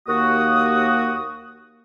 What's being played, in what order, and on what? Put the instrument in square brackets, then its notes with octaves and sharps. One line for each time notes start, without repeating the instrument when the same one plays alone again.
[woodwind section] D#2 A#3 F#4 D#6